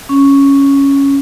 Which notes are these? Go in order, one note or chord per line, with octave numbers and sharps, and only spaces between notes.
C#4